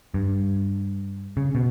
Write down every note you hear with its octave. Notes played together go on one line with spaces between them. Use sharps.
G2
C#3
B2